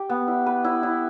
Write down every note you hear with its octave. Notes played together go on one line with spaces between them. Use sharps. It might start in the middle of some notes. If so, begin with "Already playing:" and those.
Already playing: G4
B3
E4
B4
E4
E4